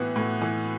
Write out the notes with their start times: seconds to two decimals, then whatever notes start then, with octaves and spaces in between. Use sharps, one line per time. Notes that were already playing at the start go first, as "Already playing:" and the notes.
Already playing: A2 E3 B3 F#4
0.16 A2
0.42 E3